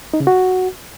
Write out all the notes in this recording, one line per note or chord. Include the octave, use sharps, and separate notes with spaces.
D#4
C#3
F#4